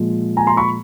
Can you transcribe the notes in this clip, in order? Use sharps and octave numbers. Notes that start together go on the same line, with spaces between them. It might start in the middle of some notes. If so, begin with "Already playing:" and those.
Already playing: A#2 F3 G#3
G#5 A#5
A#5 C6
B5 C#6